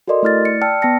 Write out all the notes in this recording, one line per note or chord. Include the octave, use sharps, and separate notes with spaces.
F#4 A4 A#4 D5 D#5 C6
A3 E4 F6 A6
D5 C#7
D5 G5 A5 E6 F6 C#7
B3 G5 A5 F6 A#6 C#7